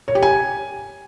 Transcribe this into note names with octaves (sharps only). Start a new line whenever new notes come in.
C#5
G4
G#5